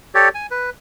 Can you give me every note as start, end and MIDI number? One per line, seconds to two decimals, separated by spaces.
0.15 0.29 67
0.15 0.29 69
0.15 0.29 73
0.15 0.29 74
0.35 0.47 80
0.51 0.70 71